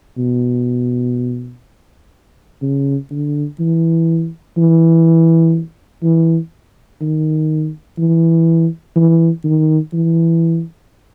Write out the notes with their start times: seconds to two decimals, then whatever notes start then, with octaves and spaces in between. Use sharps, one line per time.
0.18 B2
2.62 C#3
3.11 D3
3.60 E3
4.58 E3
6.03 E3
7.01 D#3
7.98 E3
8.96 E3
9.44 D#3
9.93 E3